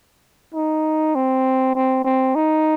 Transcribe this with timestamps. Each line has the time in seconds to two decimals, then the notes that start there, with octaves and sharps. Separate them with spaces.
0.54 D#4
1.15 C4
1.75 C4
2.04 C4
2.35 D#4